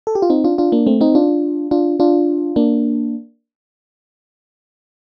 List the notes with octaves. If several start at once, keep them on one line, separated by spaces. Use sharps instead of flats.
A4
G4
F4
C4 D#4
D4 F4
D4 F4
A#3 D4
A3 C4
C4 D#4
D4 F4
D4 F4
D4 F4
A#3 D4